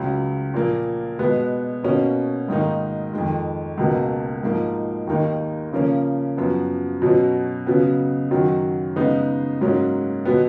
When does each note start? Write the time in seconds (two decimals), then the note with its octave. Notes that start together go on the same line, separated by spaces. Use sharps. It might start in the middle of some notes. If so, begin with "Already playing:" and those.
Already playing: C#2 C#3 F#3
0.54 A#2 F3 A#3
1.19 B2 G#3 B3
1.83 B2 A#3 C#4
2.48 G#2 D#3 A#3 D#4
3.13 F2 D#3 G#3
3.77 C#2 B2 A#3
4.43 G#2 F3 A#3 D#4
5.07 D#2 D#3 A#3 D#4
5.72 C#3 F3 A#3 C#4
6.37 F#2 F3 B3
7.02 B2 F#3 C#4
7.67 C#3 F#3 B3
8.31 F#2 D#3 F#3
8.96 C#3 G#3 B3 D#4
9.61 G#2 F#3 A#3 C#4
10.25 B2 F#3 B3